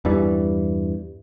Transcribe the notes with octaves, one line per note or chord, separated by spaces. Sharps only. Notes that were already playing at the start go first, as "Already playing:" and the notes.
E2 G2 E3 G3